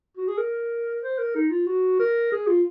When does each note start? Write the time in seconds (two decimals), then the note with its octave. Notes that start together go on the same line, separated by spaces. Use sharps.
0.17 F#4
0.28 G#4
0.38 A#4
1.02 C5
1.18 A#4
1.35 D#4
1.50 F4
1.67 F#4
1.99 A#4
2.32 G#4
2.47 F4